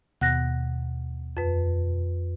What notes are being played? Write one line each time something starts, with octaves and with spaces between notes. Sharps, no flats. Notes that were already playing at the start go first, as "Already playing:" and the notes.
D#2 B2 F#5 F#6 A#6
F2 B4